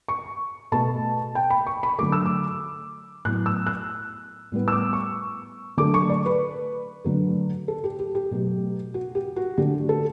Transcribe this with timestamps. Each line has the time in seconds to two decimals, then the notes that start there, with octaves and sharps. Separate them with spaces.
0.08 C#6
0.72 B2 A3 A5
1.35 G5
1.50 B5
1.67 C#6
1.83 B5
1.99 D3 F#3 A3 D6
2.12 E6
2.26 D6
3.25 A2 F#3 B3 F#6
3.46 E6
3.67 F#6
4.52 A2 G3 B3
4.68 E6
4.72 D6
4.93 C#6
5.77 D3 F#3 A3 D6
5.94 C#6
6.09 D5
6.26 B4
7.04 D3 F#3 A3
7.68 A4
7.84 G4
7.99 G4
8.15 G4
8.31 B2 F#3 A3
8.94 F#4
9.15 G4
9.36 F#4
9.57 D3 A3 G4
9.89 A4